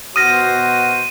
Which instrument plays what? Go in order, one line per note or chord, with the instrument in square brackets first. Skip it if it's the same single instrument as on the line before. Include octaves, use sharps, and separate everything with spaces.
[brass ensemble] B2 F#4 C5 [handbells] D#6 F6 A#6 [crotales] D#7